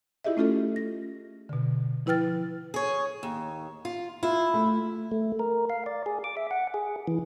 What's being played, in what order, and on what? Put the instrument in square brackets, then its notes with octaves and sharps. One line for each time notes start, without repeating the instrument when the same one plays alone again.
[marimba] E4 F4 G4 G#4 D#5 E5
A3 C#4 F4 G4 A4 D#5
A#6
B2 D3
F3 E4 B4 G5 F6 A6
[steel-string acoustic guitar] G#4 C#5
D#2
F4
[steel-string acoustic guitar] E4 [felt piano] F4
[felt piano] A3
[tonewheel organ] A3
A#4
F5
D5
G#4
D6
E5
F#5
G#4
E3